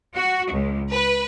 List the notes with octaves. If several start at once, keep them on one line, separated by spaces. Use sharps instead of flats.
F#4
C#2
B4